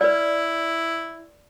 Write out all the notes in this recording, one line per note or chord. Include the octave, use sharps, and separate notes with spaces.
E4 B4 D5